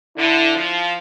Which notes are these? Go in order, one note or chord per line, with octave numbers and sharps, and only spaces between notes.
D3 E4
F3